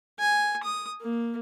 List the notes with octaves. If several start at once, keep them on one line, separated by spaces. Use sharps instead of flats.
G#5
D#6
A#3